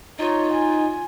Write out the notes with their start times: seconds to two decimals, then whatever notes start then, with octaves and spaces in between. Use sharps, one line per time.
0.19 D#4 F4 C#5
0.53 G#5